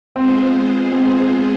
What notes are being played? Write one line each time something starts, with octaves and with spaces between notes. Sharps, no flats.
G#3 B3 C4 F4 G#4 C5
C4